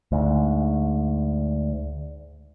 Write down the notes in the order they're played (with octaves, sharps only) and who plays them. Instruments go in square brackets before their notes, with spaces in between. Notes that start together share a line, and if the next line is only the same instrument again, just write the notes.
[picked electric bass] D2 G#2